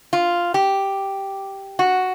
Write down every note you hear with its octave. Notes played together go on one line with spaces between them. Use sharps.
F4
G4
F#4